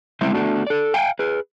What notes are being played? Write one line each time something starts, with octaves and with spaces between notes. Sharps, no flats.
G3 G#3 C4 E4 C5 E5
A3 B3 D4 F#4
A4 D5
F5 G5 G#5
G#4 B4